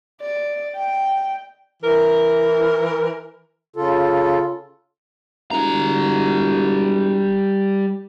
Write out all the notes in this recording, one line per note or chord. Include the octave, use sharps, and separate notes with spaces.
D5
G5
E3 A#4
C#3 F4 A4
E1 G3 A#5